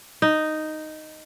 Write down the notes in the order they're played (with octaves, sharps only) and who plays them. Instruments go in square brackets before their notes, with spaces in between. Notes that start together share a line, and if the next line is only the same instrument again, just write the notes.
[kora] D#4